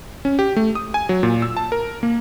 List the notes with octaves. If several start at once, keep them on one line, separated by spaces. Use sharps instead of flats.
C#4
G4
A3
D#6
G#5
F#3
A#2
E6
A5
A#4
A#3